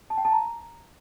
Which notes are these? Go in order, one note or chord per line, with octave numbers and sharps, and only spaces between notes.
A5
G5
A5
A#5